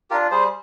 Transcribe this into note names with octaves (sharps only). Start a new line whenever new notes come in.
D4 F4 G4 A#4
G3 G#4 C5